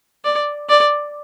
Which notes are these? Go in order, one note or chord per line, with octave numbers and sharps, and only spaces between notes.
D5
D5